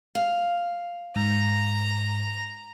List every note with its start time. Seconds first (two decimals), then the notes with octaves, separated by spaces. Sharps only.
0.15 F5
1.16 G#2 A#5